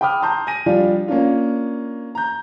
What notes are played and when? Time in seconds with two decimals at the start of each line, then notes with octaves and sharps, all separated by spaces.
0.01 G5 B5 D6 D#6 F6
0.22 A5 A#5 C6 G6
0.47 G#5 A#6 D#7
0.66 F3 G3 D4 F4
1.08 A#3 C#4 D4 F4
2.15 A#5 G6